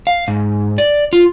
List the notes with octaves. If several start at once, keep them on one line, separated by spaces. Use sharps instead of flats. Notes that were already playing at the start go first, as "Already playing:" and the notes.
F5
G#2
D5
F4